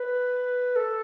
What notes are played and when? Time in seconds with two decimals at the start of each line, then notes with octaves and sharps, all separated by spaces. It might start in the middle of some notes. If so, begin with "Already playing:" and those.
Already playing: B4
0.76 A4